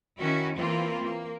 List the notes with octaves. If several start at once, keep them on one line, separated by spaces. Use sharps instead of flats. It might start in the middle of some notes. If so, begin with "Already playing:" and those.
D#3 C#4 E4 F#4
E3 A#3 C4 F4
A#3